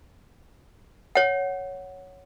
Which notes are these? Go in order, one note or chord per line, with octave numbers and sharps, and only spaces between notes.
C#5 F#5